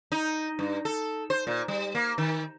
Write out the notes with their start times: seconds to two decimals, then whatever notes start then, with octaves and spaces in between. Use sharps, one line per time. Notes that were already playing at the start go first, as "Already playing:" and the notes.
0.12 D#4
0.59 G2
0.85 A4
1.30 C5
1.47 A#2
1.68 G3
1.95 A#3
2.18 D#3